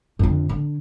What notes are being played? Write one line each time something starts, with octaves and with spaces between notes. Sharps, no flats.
F2 D3
D3